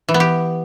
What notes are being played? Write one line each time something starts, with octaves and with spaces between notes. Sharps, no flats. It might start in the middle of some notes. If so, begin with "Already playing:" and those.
E3
B3
G4